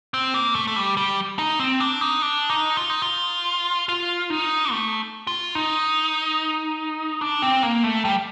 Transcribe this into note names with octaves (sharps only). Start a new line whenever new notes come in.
C4
A#3
A3
A3
G3
G3
D#4
C4
D4
D#4
D4
D#4
F4
D#4
F4
F4
D#4
A3
F4
D#4
D4
C4
A#3
A3
G3